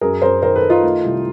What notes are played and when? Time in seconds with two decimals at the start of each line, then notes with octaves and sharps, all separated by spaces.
0.01 F#2 G#4 A#4
0.22 F#2 A#4 C5
0.42 D#3 A#4 C5
0.56 A4 B4
0.64 D#3
0.70 D#4 F4
0.83 A3
1.04 C2